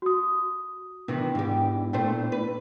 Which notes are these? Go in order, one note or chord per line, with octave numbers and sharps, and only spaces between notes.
F#4 D#6
C3 D#3 E3 B3 D4 E4
G#2 G4
A#2 A3 C5 G5
B4